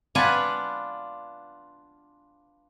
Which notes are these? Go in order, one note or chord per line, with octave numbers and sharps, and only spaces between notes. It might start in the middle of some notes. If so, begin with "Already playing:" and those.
D4 F4 B4 F#5 G#5 B5